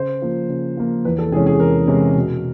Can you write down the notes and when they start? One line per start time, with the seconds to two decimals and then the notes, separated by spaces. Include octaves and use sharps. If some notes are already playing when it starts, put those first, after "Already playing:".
Already playing: C#3 C5
0.22 F3 A#3
0.49 C#3
0.77 F3 A#3
1.05 E2 B4
1.19 A4
1.32 C3 E3 G#3 C#4 G#4
1.47 G#4
1.60 E2 A#4
1.87 C3 E3 G#3 C#4
2.16 B2